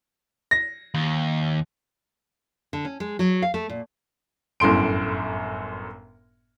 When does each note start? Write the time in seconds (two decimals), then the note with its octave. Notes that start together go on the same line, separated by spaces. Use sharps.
0.51 A#6
0.94 D#2
2.73 D3
2.85 C#4
3.00 G#3
3.19 F#3
3.42 F5
3.54 A3
3.69 A#2
4.60 G1 F#2 A2 C6 D7